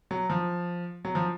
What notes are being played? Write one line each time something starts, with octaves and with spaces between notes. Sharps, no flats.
F#3
F3
F#3
F3